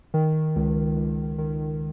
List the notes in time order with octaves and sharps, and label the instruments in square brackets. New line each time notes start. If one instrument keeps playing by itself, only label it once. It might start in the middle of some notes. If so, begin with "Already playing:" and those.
[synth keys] D#3
C#2
C#2
D#3